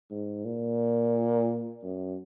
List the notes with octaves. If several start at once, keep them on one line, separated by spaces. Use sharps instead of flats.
G#2
A#2
F#2